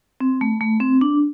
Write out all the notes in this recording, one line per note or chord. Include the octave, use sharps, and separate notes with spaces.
C4
A3
A3
C4
D4